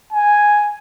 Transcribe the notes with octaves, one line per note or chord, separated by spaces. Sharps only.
G#5